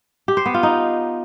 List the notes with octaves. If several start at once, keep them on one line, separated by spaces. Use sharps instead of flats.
G4
C5
B3
F4
D#4